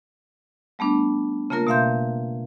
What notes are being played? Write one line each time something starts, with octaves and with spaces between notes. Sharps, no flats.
G3 A3 B3 D4
C#3 A3 A#3 F4 A#4
B2 A3 E5 F5 C6 G6